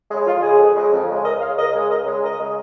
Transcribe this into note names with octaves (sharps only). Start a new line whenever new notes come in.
C#3 G#3
F2 F4
C#3 G#3 G#4
F2
C#3 G#3
F2
C#3 G#3
C#2 A#4 D#5
C#3 G#3 C#5 F5
C#2 A#4 D#5
C#3 G#3
C#2 A#4 D#5
C#3 G#3
C#2 A#4 D#5
C#3 G#3